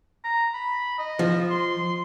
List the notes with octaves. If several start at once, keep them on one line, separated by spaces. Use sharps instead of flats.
A#5
B5
D#5
F3
C6